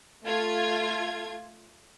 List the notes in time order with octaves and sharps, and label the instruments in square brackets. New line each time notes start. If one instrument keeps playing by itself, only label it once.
[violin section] A3 F4 G#6